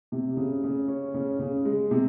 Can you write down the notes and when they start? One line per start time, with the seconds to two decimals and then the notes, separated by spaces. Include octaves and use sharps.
0.12 C3
0.37 C#3
0.64 C#3
0.88 C#4
1.14 C#3
1.39 C#3
1.65 G#3
1.91 C3